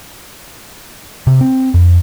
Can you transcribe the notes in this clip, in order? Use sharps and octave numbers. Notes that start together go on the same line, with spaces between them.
C3
C4
F2